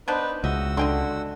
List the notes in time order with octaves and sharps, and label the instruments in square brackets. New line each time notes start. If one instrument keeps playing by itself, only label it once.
[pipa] B3 D4 C5 [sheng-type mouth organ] D#4 B4
[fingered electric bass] C#2 [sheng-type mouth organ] F#4 E6 [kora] D#5 E5
[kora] D3 [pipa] D#5 G5 C6